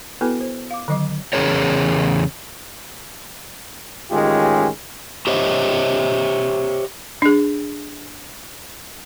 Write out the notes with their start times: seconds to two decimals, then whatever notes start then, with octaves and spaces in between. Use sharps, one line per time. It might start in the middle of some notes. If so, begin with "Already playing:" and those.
0.21 B3 E4 F#4 A4 B4 G#5
0.41 C5
0.71 F5 D6
0.88 D3 D#3 F#3 D#5 D6
1.33 E2 C#3 F3 G#4 A#4 C#5
4.11 A1 D#3 G#3 C#4 F4 G4
5.27 G4 C5 C#5 D#5 E5
7.22 D4 G#4